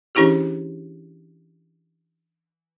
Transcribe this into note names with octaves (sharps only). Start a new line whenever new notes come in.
E3 C#4 D4 E4 G4 G#4